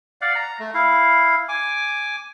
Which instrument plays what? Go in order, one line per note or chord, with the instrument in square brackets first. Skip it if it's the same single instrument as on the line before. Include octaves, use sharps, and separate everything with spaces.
[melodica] D5 F5 F#5
A#5
A3
E4 F5
G#5 D6